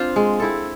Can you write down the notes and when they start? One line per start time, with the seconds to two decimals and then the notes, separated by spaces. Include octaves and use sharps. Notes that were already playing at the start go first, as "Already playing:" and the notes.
Already playing: C4 D4 F4 C5
0.16 G#3
0.40 C4 E4 A4